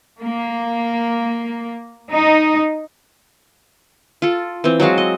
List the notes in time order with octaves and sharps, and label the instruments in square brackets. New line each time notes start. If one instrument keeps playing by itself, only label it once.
[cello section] A#3
D#4
[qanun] F4 A4
E3 C4
F#3 G#3 F#4 F5
D#5